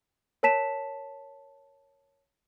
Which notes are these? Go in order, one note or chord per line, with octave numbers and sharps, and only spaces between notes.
A#4 C#5 A5 B6 E7